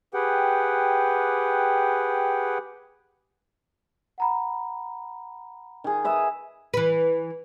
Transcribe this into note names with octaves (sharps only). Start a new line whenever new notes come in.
G4 G#4 B4 F#5 G5
F#5 A#5 B5
D#3 G#4
B4 D#5 E5
E3 B4